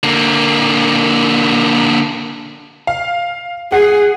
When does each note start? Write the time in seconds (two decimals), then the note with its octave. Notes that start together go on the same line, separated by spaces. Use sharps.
0.03 D3 A#3
2.87 F5
3.72 G#4 F#5 C7